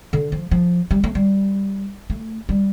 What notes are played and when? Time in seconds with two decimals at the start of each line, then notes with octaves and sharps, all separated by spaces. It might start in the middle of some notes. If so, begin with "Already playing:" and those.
0.13 D3
0.32 F3
0.51 F3
0.91 G3
1.04 A3
1.15 G3
2.10 A3
2.49 G3